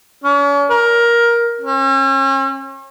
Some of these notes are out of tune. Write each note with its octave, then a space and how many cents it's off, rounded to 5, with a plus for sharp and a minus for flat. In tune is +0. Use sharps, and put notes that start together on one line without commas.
C#4 +40
A#4 +15
C#4 -40